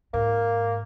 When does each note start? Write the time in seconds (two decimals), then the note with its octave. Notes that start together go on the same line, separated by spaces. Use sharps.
0.14 G#2 A#3